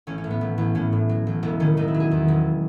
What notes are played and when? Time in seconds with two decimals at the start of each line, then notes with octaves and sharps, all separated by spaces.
0.07 A1 C#4
0.18 C#4
0.24 A2
0.30 B3
0.41 A1
0.58 A1
0.75 A2 C#4
0.92 A2
1.09 F#3
1.27 A1
1.43 E1 B3
1.60 D#3 C#4
1.77 E1 D#4
1.88 E4
1.94 F#3
2.00 G#4
2.11 E2
2.28 E1